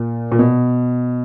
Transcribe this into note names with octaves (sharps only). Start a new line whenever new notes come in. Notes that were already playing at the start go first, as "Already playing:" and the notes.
Already playing: A#2
A#2
B2